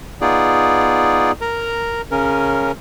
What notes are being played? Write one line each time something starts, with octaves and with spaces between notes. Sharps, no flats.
B3 D#4 F4 G#4 D5
A#4 A#5
C#3 C#4 A#4